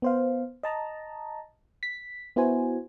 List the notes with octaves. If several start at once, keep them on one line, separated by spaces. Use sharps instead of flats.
B3 C5 F5
D#5 A5 A#5
B6
B3 E4 F#4 C5 G#5